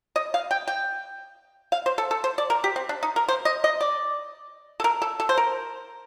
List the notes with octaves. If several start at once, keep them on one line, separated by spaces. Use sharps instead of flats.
D#5
F5
G5
G5
F5
C5
A4
A4
C5
D5
A#4
G4
C4
D4
D#4
A#4
C5
D#5
D#5
D5
A4
A#4
A4
A4
C5
A#4